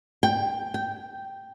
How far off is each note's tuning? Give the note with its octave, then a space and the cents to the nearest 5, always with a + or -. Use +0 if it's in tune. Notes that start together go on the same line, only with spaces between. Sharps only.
G5 +10
G5 -5